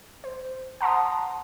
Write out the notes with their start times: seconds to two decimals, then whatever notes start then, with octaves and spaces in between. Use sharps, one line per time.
0.24 C5
0.81 F#5 A5 A#5 C6 D#6